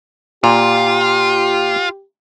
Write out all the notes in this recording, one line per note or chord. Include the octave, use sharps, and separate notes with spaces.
A#2 F4 G4